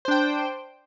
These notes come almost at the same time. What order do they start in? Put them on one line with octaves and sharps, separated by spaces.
C5 D4 G5